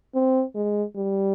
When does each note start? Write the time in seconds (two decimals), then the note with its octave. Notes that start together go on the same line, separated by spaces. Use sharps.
0.15 C4
0.55 G#3
0.96 G3